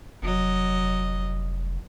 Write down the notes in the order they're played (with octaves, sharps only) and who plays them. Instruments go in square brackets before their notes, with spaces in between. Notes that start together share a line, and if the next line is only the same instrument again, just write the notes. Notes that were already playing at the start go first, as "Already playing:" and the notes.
[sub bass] F1 [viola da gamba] F#3 D#5